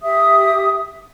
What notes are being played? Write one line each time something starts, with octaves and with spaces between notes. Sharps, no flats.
G4 E5 D#6